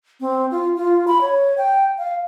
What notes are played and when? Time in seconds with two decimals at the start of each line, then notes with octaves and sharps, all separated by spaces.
0.21 C4
0.51 F4
0.76 F4
1.08 B5
1.21 C#5
1.58 G5
1.98 F5